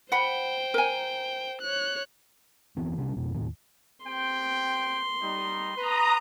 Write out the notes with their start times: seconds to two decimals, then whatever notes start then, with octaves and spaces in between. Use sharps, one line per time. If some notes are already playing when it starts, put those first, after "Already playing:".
0.12 C5 F#5 G5 B5
0.74 A#4 G#5
1.61 C#5 F#6
2.77 F1 E3 B3 C4
2.97 C3 G3 C#4 D4
3.17 F2 B2
3.34 D#2 A2 D#3
4.06 C4 G4 G5 C6
5.22 G3 D#4
5.78 B4 A#5 D#6